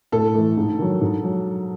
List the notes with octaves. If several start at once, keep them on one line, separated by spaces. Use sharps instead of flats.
A2 A4
E3 A3
G#2
D#3 F#3
G#2
F#3